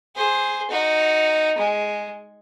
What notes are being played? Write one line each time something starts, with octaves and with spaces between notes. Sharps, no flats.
G#4 C5
D#4 F#4
G#3